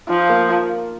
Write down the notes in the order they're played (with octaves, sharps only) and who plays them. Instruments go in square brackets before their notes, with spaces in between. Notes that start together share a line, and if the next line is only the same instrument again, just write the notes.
[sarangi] F3 [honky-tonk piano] F4
[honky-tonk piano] A#3